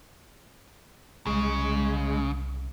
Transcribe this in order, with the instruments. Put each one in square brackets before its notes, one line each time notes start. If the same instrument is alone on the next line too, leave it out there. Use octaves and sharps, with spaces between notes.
[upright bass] C2 [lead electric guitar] C#3 [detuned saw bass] G#3